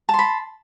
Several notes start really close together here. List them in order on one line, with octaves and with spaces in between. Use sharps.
A5 C6 B5